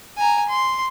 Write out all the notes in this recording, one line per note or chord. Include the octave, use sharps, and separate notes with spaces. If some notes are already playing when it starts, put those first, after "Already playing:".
G#5 A#5
C6